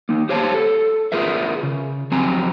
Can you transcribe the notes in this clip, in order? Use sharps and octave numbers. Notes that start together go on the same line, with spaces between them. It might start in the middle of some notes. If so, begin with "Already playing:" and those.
A#3 D#4
G4 C5 C#5 F5 G5 A5
A4
F4 G#4 A#4 B4 E5
C#3
F2 F#3 C4 G#5 A#5